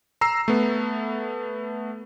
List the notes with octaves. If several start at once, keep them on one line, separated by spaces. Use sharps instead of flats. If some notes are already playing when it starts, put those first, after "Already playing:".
A#5 E6 C7
A3 B3